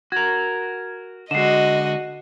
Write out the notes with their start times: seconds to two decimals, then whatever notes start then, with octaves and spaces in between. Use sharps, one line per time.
0.12 F#4 A#4 G#6
1.31 D3 G#3 F#4 D#5 C7 E7